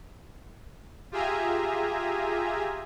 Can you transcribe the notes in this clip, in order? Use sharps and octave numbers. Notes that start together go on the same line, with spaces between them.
F4 G4 G#4 E5 G#5 A#5